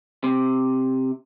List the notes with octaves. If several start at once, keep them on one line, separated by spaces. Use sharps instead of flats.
C3